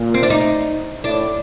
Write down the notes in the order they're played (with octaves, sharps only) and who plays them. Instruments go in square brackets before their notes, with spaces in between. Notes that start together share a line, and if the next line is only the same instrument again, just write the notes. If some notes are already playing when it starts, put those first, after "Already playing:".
Already playing: [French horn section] A#2
[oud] C4
D4
D#4
[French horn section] A2 [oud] D4